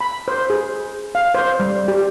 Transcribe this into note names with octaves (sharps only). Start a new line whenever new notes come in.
B5
C5
G#4
F5
C5
G3
G4